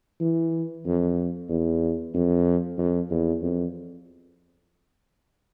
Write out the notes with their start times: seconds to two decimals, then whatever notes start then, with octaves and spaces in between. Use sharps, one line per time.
0.21 E3
0.85 F2
1.49 E2
2.14 F2
2.78 F2
3.10 E2
3.42 F2